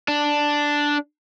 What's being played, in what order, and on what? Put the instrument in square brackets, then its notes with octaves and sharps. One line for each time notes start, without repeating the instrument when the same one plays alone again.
[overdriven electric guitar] D4